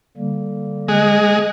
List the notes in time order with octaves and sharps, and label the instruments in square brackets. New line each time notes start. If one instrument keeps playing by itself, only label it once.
[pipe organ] D3 G3 A#3
[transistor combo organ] G#3 [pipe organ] D#5 F#6